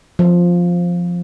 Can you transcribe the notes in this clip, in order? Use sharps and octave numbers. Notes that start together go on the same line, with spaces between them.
F3